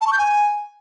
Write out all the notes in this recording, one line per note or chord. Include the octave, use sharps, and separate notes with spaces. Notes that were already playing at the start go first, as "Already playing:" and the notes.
A5
C#6
G6
G#5